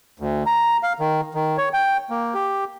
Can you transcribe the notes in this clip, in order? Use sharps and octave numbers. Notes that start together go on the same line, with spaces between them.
D2
A#5
F5
D#3
D#3
C#5
G5
A#3
G4